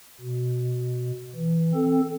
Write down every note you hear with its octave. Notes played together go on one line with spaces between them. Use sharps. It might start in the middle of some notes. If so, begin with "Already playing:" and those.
B2
E3
C4 A4